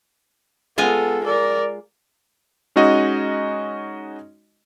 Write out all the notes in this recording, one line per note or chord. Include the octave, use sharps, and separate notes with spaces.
G#3 B3 F4 A4 G#5
A#4 D5
G#3 C#4 D#4 F#4 D#5